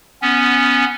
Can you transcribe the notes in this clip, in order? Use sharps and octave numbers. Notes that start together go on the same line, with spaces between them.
B3 C#4